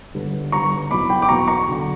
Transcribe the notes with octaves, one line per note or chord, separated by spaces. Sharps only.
G1 G2 D3
G1 G2 D3 A#5 C#6
F#1 E2 B2 F#3 B5 D6
G5 B5
D6
F#1 E2 B2 F#3 A#5 C#6
A#5 C#6
D3 F#3